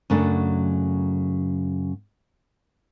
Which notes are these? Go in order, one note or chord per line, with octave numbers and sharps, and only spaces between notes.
F#2 C#3 F#3 A3 D4